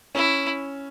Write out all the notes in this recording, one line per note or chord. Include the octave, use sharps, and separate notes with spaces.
C#4 E4